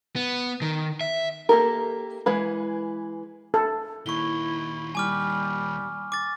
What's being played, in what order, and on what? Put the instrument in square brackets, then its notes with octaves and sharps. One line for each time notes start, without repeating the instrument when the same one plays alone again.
[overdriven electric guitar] B3
D#3
E5
[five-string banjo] A#3 G4 A4 A#4
E3 G#3 B4
[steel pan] A4
[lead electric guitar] A#2 D#3 [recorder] E4 [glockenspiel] C#6 G7
[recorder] G3 [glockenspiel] G#5 D6 F6
[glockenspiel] D6 A6